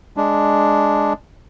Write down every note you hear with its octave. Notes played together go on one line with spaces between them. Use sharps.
G#3 D4